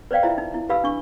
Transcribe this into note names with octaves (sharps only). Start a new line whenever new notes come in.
B4 C5 D5 F5 G5
E4 F4 C5 E5 A#5
D#4
E4
G4 B4 F5 B5 E6
D4 C#6